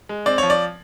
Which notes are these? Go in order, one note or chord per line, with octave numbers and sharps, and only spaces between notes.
G#3
C4 D5
F3 C#5
D5